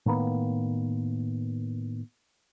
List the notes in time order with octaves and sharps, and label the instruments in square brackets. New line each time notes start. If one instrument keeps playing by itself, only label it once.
[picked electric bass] A2 D#3 A#3 B3